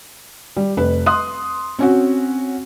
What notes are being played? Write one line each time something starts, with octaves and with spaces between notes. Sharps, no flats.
G3
F1 B4
C6 D#6 F#6
C4 C#4 F#4